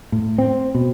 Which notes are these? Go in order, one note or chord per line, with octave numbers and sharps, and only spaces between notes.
A2
C4
B2